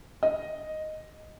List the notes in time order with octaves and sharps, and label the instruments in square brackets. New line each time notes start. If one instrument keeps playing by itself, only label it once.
[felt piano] D#5